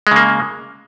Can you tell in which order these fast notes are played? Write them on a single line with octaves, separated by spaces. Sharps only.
G#3 C#3 A#3